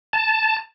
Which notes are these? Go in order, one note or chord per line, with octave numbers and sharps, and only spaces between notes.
A5